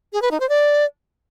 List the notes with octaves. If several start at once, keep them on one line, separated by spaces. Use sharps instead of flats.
G#4
B4
D#4
C5
D5